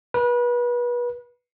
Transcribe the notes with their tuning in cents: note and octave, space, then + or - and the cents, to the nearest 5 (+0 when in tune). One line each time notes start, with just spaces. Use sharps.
B4 -30